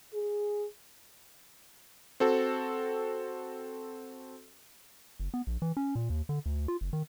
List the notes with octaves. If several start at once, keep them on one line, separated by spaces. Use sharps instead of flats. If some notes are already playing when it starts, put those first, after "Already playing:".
G#4
C4 F#4 A4
F#1
B3
A#1
E3
C#4
A#2
D#2
D3
D2
F4
F#1
D#3